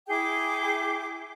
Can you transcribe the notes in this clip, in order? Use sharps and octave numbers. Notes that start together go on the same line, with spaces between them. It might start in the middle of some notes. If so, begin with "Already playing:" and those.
E4 G#4 G5 D6